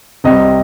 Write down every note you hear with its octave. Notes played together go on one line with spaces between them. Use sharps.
C2 C3 G3 D#5